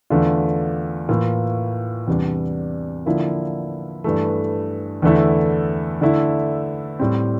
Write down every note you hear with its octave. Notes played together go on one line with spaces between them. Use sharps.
E2 D3 A3 D4 F4
A2 E3 A#3 F4
E2 C3 G3 D4
D3 F3 A#3 E4
G2 E3 A3
E2 D3 A3 E4
D3 A3 E4
A2 G3 C4